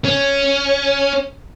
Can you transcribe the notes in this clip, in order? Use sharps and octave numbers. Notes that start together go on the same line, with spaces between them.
C#4